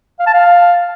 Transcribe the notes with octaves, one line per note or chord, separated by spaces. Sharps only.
F5
A5
F5